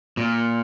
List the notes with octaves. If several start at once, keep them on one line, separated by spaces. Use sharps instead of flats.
A#2